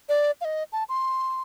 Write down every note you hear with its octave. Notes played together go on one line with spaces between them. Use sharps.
D5
F5
D#5
A5
C6